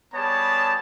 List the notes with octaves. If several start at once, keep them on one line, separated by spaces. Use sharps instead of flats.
G3 B3 G#4 C#5 A5